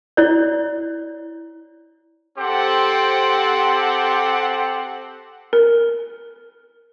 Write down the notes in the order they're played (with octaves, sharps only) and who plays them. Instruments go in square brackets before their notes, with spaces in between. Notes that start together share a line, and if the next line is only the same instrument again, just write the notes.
[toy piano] E4 C#5 D5
[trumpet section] C4 G4 A4 C5 F#5
[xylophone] A#4